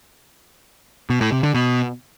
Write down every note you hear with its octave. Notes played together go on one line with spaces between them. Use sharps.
B2
A2
C3
D3
B2